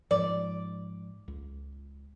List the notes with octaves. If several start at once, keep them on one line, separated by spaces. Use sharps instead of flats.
G#2 F3 D5
C#2